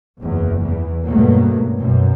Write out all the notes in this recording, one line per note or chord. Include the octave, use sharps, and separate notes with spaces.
F#1 E2
E2 E3
C#2 G2 B2 F#3 A3 A#3
F#2 B2